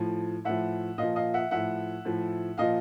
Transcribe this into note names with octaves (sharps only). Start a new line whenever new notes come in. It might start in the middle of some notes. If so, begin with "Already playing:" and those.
Already playing: A2 F3
A2 F3 E5 F#5
A#2 F3 D#5 F5
D#5 F5
E5 F#5
A2 F3 E5 F#5
A2 F3
A#2 F3 D#5 F5